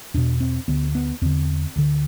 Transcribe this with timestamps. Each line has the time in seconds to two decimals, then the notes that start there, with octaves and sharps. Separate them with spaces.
0.14 E2 B2 D4
0.41 C4
0.68 D2 D3 B3
0.95 B3
1.22 E2 D3 C4
1.76 D2 D3